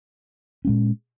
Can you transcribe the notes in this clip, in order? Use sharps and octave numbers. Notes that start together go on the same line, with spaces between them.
A#2 G#3 C#4